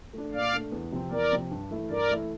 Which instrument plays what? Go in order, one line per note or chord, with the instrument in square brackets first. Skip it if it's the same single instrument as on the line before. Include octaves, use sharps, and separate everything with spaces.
[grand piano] A3 D4
[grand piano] A#2 [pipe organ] D5 F5
[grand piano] A3 D4
E2
C3 F3 C4
[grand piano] E2 [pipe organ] A#4 D5
[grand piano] C3 F3 C4
G2
E3 A3 E4
[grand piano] G2 [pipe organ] A#4 D5
[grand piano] E3 A3 E4